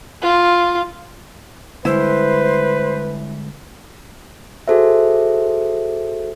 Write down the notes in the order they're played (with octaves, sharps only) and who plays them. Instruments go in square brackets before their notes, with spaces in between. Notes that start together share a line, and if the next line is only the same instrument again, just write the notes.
[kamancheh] F4
[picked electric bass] D3 G3 G#3 [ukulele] E4 [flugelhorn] B4 [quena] C5
[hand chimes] F#4 G#4 A4 C5 E5